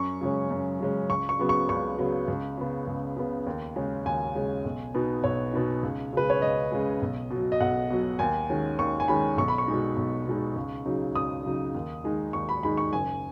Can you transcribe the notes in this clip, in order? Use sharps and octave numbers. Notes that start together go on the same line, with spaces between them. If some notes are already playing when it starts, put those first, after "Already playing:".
Already playing: F#2 C#6
C#3 G#3 C#4
F#2
C#3 G#3 C#4
C#2 C#6
C#6
C#3 F#3 B3
C#6
C#2 C#6
C#3 F#3 B3
C#2
C#3 B3
C#2
C#3 B3
D#2
C#3 G#3 C#4
D#2 G#5
C#3 G#3 C#4
B1
B2 B3 D#4
B1 C#5
B2 B3 D#4
C#2
C#3 G#3 B4
C#5
C#2 D#5
C#3 G#3
B1
B2
F#3
D#5
B1 F#5
B2 F#3
D#2 G#5
D#3 G#3 C#4
D#2 C#6
G#5
D#3 G#3 C#4 B5
B1 C#6
B5
C#6
B2 G#3 D#4
B1
B2 G#3 D#4
C#2
C#3 F#3 D#4
C#2 D#6
C#3 F#3 D#4
D#2
D#3 G#3 D#4
D#2 C#6
B5
D#3 G#3 D#4 B5
C#6
F#1 G#5